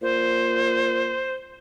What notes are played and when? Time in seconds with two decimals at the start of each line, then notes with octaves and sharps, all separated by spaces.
0.02 A#2 C5